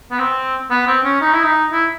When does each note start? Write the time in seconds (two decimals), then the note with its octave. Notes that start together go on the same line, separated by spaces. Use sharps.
0.11 B3
0.19 C4
0.70 B3
0.88 C4
1.05 C#4
1.21 D#4
1.33 E4
1.44 D#4
1.72 E4